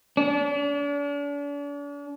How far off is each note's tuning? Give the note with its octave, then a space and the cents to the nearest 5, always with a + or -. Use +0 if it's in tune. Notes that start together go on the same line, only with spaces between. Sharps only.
D4 -40